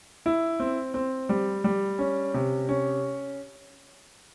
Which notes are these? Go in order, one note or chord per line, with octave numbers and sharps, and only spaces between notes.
E4
C4
C4
G3
G3
C#4
C3
C#4